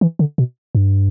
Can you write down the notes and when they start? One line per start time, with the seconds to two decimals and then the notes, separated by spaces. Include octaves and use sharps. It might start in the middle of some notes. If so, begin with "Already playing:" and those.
0.01 E3
0.19 D3
0.38 B2
0.75 G2